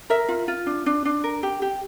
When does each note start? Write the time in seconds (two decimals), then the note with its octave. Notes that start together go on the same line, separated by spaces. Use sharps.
0.10 A#4 E5
0.29 F4
0.48 F4
0.66 D4
0.86 D4
1.05 D4
1.24 A#4
1.43 G4
1.62 G4